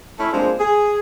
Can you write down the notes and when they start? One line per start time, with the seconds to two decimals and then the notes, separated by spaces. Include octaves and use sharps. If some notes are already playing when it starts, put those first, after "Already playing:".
0.18 A3 C#4 E4
0.32 F3 G#3 A#3 C4 D4
0.59 G#4